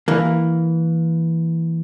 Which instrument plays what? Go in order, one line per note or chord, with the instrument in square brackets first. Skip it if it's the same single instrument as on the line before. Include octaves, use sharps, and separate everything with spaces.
[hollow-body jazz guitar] E3 A#3